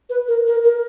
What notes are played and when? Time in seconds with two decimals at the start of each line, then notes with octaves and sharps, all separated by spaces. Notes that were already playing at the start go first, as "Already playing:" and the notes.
0.10 B4
0.28 A#4
0.47 A#4
0.64 A#4